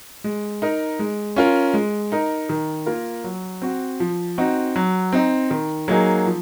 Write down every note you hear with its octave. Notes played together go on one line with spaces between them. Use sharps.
G#3
D#4 A#4
G#3
C#4 F4 A#4
G#3
D#4 A#4
D#3
A#3 F4 A#4
F#3
C4 F#4
F3
C4 D#4 F#4
F#3
C4 D#4
D#3
F#3 A#3 D#4 G#4
F3